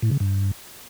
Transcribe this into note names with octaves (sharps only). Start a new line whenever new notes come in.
A2
C#3
G2